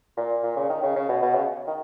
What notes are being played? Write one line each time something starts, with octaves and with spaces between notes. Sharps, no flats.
A#2
A#2
C#3
D#3
C#3
C#3
B2
B2
C#3
D#3